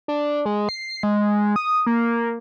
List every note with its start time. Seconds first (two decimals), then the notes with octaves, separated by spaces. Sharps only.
0.08 D4
0.46 G#3
0.69 C7
1.03 G#3
1.56 D#6
1.87 A#3